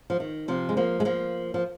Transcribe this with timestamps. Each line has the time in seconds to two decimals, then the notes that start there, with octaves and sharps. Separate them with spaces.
0.10 F3
0.20 D#3
0.48 C3 F3
0.69 G#3
0.77 F3 A#3
1.00 G#3
1.05 F3 A#3
1.54 F3